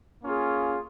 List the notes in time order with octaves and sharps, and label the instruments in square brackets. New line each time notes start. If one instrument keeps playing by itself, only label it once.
[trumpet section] A#3 C#4 F4 G#4